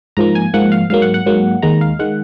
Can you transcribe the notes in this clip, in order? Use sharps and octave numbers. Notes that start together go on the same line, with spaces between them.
G#2 F3 A#3 A#5
G#5
G#2 F3 A#3 F#5
F5
G#2 F#3 A#3 F5
F#5
F#5
G#2 F#3 A#3
D#2 D#3 G#3 A#5
F5
D#3 G#3 F#5